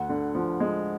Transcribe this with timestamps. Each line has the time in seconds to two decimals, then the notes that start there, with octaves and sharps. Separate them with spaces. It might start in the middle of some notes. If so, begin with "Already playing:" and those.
Already playing: D2 F#5
0.09 D3
0.35 F3
0.60 G#3